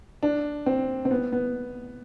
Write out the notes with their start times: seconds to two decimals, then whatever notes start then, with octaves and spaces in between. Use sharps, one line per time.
0.23 D4
0.66 C4
1.05 C4
1.11 B3
1.32 B3